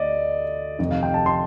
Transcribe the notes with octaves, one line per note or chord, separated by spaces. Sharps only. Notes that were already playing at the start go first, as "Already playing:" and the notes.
Already playing: D2 D3 D5 D#5
F1 F2 D#3 D#5
F5
G5
A5
C6